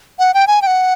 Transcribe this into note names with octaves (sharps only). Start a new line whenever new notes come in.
F#5
G5
G#5
G5
F#5